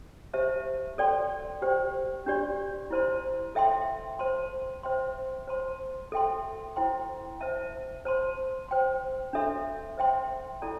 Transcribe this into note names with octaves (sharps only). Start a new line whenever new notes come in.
G4 C5 E5 A5
A4 D5 G5 C6
G4 C5 G5
D4 G4 D5 C6
E4 C5 A5 C6
A4 E5 G5 C6
C5 A5 C6
C5 E5 G5 C6
C5 A5 C6
A4 E5 G5 C6
E4 C5 G5 C6
C5 E5 A5
C5 A5 C6
C5 G5 C6
D4 A4 E5 C6
C5 E5 G5 C6
E4 A4 D5 A5